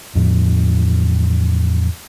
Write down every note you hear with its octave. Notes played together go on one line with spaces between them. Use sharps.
E2 A2 F3